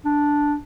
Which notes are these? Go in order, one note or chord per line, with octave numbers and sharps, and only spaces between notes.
D4